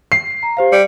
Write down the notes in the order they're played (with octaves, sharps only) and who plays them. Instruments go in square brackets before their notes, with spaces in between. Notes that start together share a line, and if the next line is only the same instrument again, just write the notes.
[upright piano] C7
[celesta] A#5
G4 C5 F5
[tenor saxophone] G3 [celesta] C#7